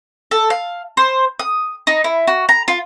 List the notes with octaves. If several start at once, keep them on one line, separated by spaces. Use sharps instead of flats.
A4
F5
C5
D#6
D#4
E4
F#4
A#5
F4